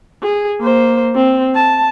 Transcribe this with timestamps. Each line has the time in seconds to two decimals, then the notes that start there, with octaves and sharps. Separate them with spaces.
0.23 G#4
0.61 A#3 C5
1.16 C4
1.55 A5